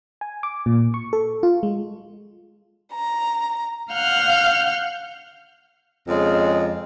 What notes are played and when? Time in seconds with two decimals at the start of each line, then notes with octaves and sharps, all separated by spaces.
0.21 G#5
0.43 D6
0.66 A#2
0.94 C#6
1.13 A4
1.43 F4
1.63 G#3
2.93 A#5
3.92 F5 F#5 F6 G6
6.08 F2 C#3 G#3